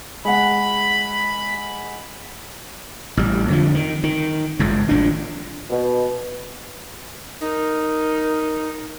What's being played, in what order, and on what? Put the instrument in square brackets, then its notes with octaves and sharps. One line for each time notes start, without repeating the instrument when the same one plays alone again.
[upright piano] G#3 F#5 [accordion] B5
[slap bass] A1 G3
F2 D3 F3
D#3
D#3
G#1 C#2 G2
G#1 A2 F3 D4
[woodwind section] B2
[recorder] D#4 [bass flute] A#4